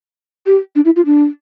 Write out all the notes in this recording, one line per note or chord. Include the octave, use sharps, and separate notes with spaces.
G4
D4
E4
F4
D4